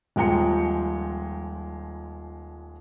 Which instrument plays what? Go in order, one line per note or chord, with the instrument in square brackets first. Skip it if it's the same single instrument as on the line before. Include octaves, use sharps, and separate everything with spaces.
[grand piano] D#1 F3 G#3 G5 A#5 C#7